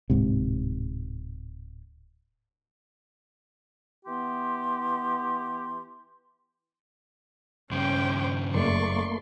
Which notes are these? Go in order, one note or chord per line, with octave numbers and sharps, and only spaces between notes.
D1 G#2 C3
E3 B3 G4 C6
G2 C#3 C#4 C5 G5 D6
F#1 A3 A#3 D5 C6 C#6